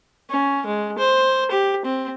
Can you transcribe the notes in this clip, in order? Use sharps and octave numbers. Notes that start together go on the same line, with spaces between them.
C#4
G#3
C5
G4
C4